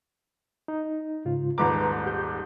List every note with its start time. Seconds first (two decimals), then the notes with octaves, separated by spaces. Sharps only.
0.68 D#4
1.25 G#2 C#3 F4
1.58 D#1 G#2 B4 A#5 D6
2.06 G4 G6